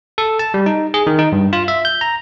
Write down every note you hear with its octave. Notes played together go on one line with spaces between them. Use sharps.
A4
A5
G3
D#4
G#4
D#3
D#4
G2
F4
E5
G6
A#5